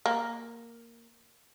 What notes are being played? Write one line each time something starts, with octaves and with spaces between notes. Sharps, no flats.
A#3